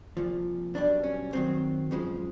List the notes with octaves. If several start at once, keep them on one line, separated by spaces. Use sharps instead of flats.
C2 A#2 F3
B1 B2 G3 D4
C#4
F#2 D#3 F#3 C4
F#2 C#3 F3 G#3